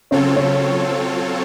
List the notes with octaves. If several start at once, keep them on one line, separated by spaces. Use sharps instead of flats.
C#3 F#3 C4 C#4 F4 A4 C#5
C#3 C#4